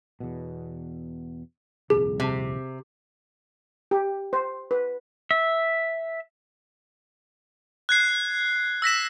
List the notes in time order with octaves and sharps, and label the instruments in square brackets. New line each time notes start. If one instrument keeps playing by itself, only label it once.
[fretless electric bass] E2 B2
[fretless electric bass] D#1 C2 F2 [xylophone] G#4
[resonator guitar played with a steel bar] C3
[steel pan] G4
C5
B4
[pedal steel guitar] E5
[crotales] F#6 G#6 C7
E6 A#6 B6 E7